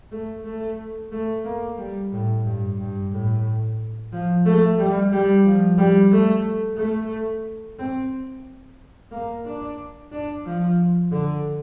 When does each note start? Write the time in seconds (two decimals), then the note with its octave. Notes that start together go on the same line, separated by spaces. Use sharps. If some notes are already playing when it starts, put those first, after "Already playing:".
0.12 A3
0.45 A3
1.12 A3
1.45 A#3
1.78 G3
2.12 A2
2.45 G2
2.79 G2
3.12 A2
4.12 F3
4.46 A3
4.79 G3
5.12 G3
5.45 F3
5.78 G3
6.11 A3
6.78 A3
7.79 C4
9.11 A#3
9.45 D4
10.12 D4
10.45 F3
11.12 D3